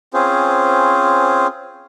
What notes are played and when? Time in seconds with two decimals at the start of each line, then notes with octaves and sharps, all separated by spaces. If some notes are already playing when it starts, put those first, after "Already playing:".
0.14 C4 C#4 F4 G#4 C5